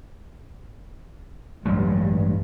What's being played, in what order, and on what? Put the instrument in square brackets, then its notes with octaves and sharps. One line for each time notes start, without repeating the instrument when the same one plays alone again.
[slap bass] A1 F#3 G#3 [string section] G2